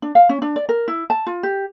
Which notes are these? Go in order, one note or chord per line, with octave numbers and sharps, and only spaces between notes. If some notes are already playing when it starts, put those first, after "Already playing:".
D4
F5
C#4
D4
D5
A#4
E4
A5
F4
G4